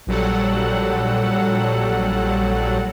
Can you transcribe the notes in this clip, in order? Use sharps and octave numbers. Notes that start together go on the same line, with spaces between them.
A#1 A#2 F#3 G3 A4 F#5